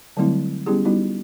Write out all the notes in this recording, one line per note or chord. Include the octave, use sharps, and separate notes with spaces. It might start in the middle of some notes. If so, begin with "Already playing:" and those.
D3 F#3 G3 A3 C4 E4
G3 B3 C#4 E4 G4 G#4
G3 B3 D#4 E4 F#4